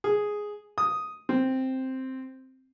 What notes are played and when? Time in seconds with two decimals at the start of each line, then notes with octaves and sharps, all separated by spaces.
0.04 G#4
0.78 D#6
1.29 C4